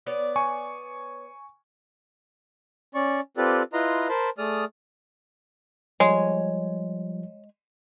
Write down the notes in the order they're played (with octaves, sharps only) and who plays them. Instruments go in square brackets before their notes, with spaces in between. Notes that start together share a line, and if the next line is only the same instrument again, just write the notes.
[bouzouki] B3 C#5 D5
[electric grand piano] G#5 C#6
[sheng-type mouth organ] C#4 D5 C#6
C4 F4 G4 A4 B4 D5
E4 F4 B4 D#5 A#5 C6
A#4 C5 A5 B5 C6
A3 G#4 D5 D#6 F6
[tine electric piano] F3 G3 [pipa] G#3 [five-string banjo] C#5